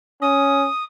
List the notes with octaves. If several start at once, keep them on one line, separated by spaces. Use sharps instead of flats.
C#4 D#6